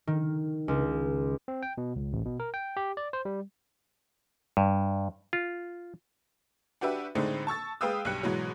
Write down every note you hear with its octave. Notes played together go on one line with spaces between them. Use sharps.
D#3
C#2
C4
G5
B2
C#2
A1
B2
A#4
G5
G4
D5
C5
G3
G2
F4
D4 F#4 G4 B4 E5
A2 D3 G#3 A3 C4 D#4
A5 C#6 E6 A6
G#3 B4 F5 G5 D#6 E6
B1 G2 G4 F#6 C#7
G#2 B2 E3 F#3